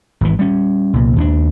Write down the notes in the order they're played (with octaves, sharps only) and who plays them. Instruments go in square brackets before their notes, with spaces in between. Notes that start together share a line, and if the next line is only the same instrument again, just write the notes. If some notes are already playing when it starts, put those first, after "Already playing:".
[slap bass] G#1 E3
G3 C#4
C2 A#2
D#2 C4 D4